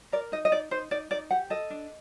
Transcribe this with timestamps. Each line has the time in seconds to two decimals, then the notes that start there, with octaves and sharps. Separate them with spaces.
0.12 A#4 D5
0.32 D#4 D#5
0.45 D#5
0.52 D#4 D5
0.71 D#4 C5
0.91 D#4 D5
1.11 D#4 D5
1.31 G4 F#5
1.50 A4 D#5
1.70 D4